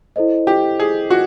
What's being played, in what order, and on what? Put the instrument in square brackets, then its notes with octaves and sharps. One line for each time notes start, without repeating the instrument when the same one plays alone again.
[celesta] E4 A4 C5 D#5
[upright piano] G4
G#4
F#4